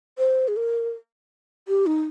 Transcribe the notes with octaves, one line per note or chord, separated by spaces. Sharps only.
C5
G#4
A#4
G4
D#4